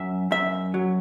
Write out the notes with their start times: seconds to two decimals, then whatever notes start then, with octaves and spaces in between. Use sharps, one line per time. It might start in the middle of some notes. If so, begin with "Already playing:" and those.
Already playing: F#2 E5
0.31 F#2 E5
0.74 F#3